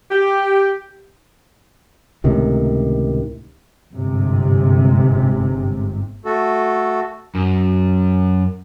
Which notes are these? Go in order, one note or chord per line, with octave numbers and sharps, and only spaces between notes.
G4
C#2 A2 C3 D#3
G1 G#2 C3
A3 F#4 A4
F#2